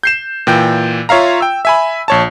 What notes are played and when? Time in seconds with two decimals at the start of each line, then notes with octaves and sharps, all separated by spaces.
0.03 G6 C7 E7
0.47 A#2 E3 G5 G6
1.09 F4 C#5 E5 F5 A#5
1.41 G5 E6
1.65 E5 G#5 B5
2.08 A#1 C#5 A5